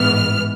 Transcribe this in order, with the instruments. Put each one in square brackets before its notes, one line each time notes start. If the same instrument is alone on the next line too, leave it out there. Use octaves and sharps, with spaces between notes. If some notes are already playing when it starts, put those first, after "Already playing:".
Already playing: [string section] A1 G#2 E3 G#3 B3 F6